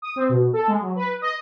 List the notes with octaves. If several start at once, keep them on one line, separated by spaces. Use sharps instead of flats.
D#6
C4
B2
A4
G#3
F#3
B4
D#5